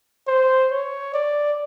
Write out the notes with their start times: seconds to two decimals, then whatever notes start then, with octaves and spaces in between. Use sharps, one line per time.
0.28 C5
0.71 C#5
1.14 D5